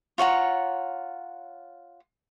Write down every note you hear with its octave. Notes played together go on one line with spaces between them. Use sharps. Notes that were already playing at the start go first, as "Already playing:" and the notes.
F4 C#5 F#5 A#5